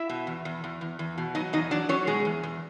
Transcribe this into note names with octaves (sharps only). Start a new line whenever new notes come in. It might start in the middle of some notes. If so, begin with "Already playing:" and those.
Already playing: E4 E5
B2
E2
E2
E2
E2
E2
B2
F#3 D#4 D#5
E2 D#4 D#5
F#3 D4 D5
F#3 C#4 C#5
B2 G#3 G#4
E2
E2